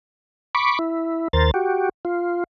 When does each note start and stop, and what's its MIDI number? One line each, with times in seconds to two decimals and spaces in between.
0.55 0.79 83
0.55 0.79 85
0.55 0.79 86
0.79 1.28 64
1.33 1.51 39
1.33 1.51 70
1.33 1.51 72
1.33 1.51 93
1.54 1.89 66
1.54 1.89 67
2.05 2.44 65